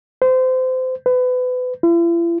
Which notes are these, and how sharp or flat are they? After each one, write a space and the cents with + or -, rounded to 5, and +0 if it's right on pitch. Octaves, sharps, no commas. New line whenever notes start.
C5 -25
B4 +30
E4 +45